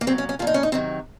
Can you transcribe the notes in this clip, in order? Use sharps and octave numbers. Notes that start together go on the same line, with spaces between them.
A#3
A#2 F#3 C4
C#4
C#4
A#2 F3 F4
D#4
C#4
D#4
C3 D#3 F#3 C4